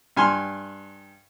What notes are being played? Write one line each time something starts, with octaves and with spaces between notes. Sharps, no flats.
G2 G#5 C6 F6